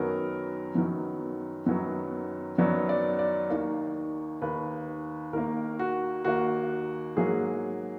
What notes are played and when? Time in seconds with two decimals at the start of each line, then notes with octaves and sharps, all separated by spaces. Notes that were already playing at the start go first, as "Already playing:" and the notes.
Already playing: F#2 D#3 F#3 B3 A#4
0.75 F#2 D#3 F#3 B3
1.66 F#2 D#3 F#3 B3
2.58 F#2 D#3 F#3 B3 D5
2.89 D5
3.19 D5
3.50 D#2 D#3 A#3
4.42 D#2 D#3 A#3 B4
5.33 D#2 D#3 A#3 A#4
5.79 F#4
6.25 D#2 D#3 A#3 F#4
7.16 G#2 F#3 A#3 G#4